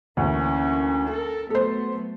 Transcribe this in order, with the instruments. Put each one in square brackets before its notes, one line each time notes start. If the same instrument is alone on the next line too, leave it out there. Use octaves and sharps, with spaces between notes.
[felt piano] D2 E3 [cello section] A#3 C#4
[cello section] A4 A#4
[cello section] F#3 A3 B3 [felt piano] A4 C5